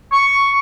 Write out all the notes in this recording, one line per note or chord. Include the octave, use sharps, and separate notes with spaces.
C#6